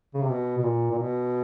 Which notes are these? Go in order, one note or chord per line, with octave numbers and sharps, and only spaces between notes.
C#3
C3
B2
B2
A#2
A#2
B2